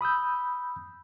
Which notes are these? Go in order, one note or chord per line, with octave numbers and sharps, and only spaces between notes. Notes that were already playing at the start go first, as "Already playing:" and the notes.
B5 D#6 E6 G6